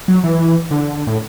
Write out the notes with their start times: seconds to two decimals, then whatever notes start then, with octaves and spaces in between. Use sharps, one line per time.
0.08 F#3
0.24 E3
0.71 D3
1.07 A2